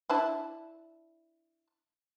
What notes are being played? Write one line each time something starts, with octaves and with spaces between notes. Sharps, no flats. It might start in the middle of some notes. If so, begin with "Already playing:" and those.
D4 E4 A5